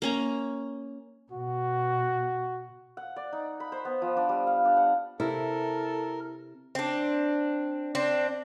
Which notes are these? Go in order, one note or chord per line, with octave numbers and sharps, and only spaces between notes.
A#3 C#4 A#5
B2 F#4
F#5
D5
D#4
B5
C5
B3
F3
D4
G3
F5
D4
F#5
C3 E4 A4 A#4
C4 D4
C4 D4